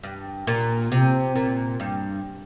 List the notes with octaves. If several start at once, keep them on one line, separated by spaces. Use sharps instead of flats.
G2
A#2
C3
A#2
G2